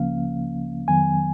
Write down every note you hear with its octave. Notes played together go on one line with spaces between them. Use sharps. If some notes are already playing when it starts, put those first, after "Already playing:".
Already playing: C#2 C#3 F3 A#3 C#4 F5
F2 D#3 F#3 B3 G#5